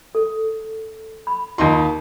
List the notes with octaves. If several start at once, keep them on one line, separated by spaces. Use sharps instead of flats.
A4
B5
D#2 D#4 F4 A#5 C6